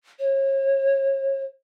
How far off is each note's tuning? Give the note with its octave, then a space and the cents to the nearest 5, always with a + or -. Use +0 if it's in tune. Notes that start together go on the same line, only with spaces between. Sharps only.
C#5 -35